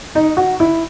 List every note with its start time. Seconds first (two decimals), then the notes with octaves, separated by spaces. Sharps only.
0.15 D#4
0.37 F#4
0.60 E4